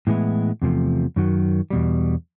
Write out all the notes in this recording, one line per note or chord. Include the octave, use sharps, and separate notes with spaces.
A2 E3 G#3 B3 E4
E2 C3 F3 A3
F#2 D#3 F#3
E2 B2 G3